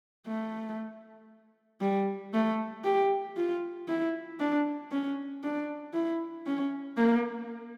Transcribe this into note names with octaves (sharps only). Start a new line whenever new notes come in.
A3
G3
A3
G4
F4
E4
D4
C#4
D4
E4
C#4
A#3